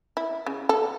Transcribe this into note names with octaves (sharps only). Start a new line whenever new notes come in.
E4
C#3
A4